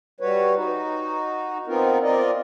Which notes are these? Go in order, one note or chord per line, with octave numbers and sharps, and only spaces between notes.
G3 F#4 B4 C#5
D#4 F#4
B3 C4 D#4 F4 A#4
C4 F4 A#4 D5 D#5